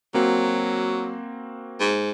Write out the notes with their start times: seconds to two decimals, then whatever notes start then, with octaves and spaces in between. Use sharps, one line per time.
0.14 F#3 A#3 C4 F#4
1.80 G#2